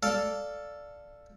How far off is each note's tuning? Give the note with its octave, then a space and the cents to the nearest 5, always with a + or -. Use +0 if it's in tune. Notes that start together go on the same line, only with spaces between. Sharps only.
A4 +0 D5 +0 F5 -5